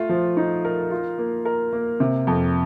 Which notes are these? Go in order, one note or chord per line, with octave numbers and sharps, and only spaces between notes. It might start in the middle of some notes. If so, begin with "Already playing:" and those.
Already playing: A3 F4
F3
D#4
A#4
F4
A#3
A#4
A#3
C3
F2